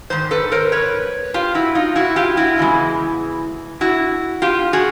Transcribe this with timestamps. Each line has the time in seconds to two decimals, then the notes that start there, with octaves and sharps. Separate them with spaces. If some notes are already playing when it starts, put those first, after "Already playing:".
0.10 G#2 D#3 C5
0.31 A4 B4
0.52 A#4 C5
0.72 B4 C#5
1.34 F4 G4
1.55 E4 F#4
1.75 D#4 F4
1.96 E4 F#4
2.16 F4 G4
2.37 E4 F#4
2.57 E2 C#3 E3 G#3
3.81 E4 F#4
4.42 F4 G4
4.73 F#4 G#4